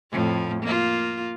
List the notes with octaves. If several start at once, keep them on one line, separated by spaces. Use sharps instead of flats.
F2 A2 F3
A#3 F4